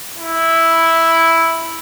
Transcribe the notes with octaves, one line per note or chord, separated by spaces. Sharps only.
E4